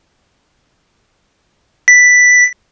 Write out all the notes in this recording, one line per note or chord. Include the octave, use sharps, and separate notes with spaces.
B6